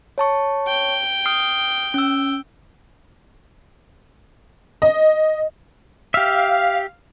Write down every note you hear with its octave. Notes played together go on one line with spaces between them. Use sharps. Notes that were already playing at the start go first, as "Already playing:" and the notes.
C#5 A5 C#6
G5
D#6 F6 C7
C#4 E6
D#5
G4 E5 F5